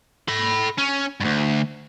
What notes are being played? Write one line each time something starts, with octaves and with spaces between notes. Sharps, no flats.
A4 B5
C#4
D2 G2